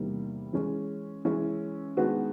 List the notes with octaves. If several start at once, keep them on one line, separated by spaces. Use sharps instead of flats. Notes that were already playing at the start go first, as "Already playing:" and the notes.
Already playing: E2 C3 D#3 G3 A#3
E3 G#3 C#4
E3 G#3 C#4 E4
D#3 G#3 B3 D4 F#4